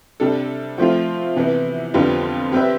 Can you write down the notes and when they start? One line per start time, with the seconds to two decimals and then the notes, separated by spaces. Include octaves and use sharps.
0.20 C3 G3 D4 A4
0.78 F3 A3 C4 F4
1.36 C3 E3 B3 E4
1.94 F2 D3 G3 B3 F4
2.52 G3 C4 G4 B4 E5